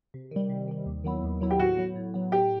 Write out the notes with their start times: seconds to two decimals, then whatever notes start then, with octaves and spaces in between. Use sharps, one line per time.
0.14 C3
0.31 D#3 G3
0.49 C3
0.68 D#3 G3
0.86 D#2
1.04 D#3 F#3 B3 E4
1.23 D#2
1.40 D#3 F#3 B3 E4
1.50 G4
1.59 A2 F#4
1.77 F#3 B3
1.95 A2
2.14 F#3 B3
2.32 A2 G4